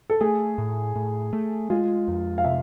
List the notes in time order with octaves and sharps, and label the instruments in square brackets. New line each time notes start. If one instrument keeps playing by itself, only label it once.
[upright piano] A4
[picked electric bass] A3 [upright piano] G#4
[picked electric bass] A2
A2
A3
[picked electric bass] G#3 [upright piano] F4
[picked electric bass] F2
[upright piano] F5
[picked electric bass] C3 [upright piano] E5